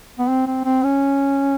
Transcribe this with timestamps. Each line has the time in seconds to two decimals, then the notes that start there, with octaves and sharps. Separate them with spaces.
0.19 B3
0.28 C4
0.47 C4
0.65 C4
0.84 C#4